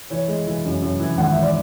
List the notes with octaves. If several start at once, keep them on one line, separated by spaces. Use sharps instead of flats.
E3 C#5
G#3
E3
F#2
F#2
E3
G#1 F#5
E3 E5
D5